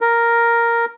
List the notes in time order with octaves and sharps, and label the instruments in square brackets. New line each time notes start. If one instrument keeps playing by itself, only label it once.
[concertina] A#4